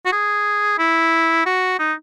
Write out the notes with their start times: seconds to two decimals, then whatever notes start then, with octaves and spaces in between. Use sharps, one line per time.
0.06 F#4
0.12 G#4
0.79 E4
1.46 F#4
1.79 D#4